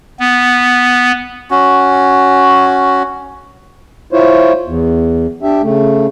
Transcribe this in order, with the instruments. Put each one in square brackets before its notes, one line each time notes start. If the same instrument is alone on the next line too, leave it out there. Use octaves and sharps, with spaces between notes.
[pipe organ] B3
[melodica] C#4 F#4
[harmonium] E4 F4 C5 C#5
E2
D4 G4 E5
C#3 A3